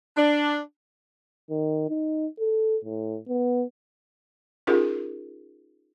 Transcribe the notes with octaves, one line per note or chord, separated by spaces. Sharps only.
D4
D#3
D#4
A4
A2
B3
C#4 D#4 F4 G4 G#4 A#4